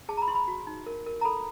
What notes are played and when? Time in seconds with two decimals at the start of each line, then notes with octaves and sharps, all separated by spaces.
0.09 G#4 A5
0.17 A#5
0.22 B5
0.28 E4 C6
0.35 B5
0.48 F#4
0.67 D#4
0.86 A#4
1.06 A#4
1.21 A#5
1.25 A4 B5